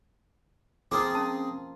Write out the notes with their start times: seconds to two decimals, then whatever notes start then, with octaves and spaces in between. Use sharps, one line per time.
0.91 F3 A#3 C4 F4 G#4 D6
1.15 C#4 A5